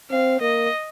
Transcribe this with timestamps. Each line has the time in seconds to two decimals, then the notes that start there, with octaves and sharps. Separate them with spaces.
0.11 C4 F5
0.41 A#3 D#5